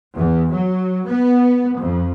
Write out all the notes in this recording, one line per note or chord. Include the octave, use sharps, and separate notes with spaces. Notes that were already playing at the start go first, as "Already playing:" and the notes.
E2
F#3
B3
F2